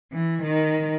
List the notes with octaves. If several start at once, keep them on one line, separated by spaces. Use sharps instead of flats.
E3
D#3